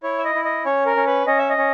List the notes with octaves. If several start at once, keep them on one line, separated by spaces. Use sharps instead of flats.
E4 C#5
E5
D#5
E4
D#5
C#4 C#5
A#4
C#4
B4
C#4 D#5
E5
D#5
C#4